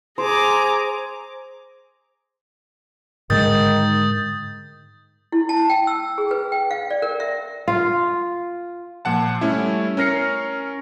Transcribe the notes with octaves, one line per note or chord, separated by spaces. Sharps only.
G#4 C5 A#5 D6
G#2 D3 D#3 G#3 D#6 G6 A6
E4
A5
G5
E6
G#4
B4
G5
F5
D5
A#4
E5
F4
A#2 F3 F#5 A5
G3 A3 C#4 E4
C#4 A#4 F6 A#6 C7 C#7